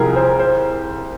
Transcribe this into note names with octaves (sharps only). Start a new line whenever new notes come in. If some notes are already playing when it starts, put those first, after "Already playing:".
Already playing: C2 F3 G#4 A#4
C5
C5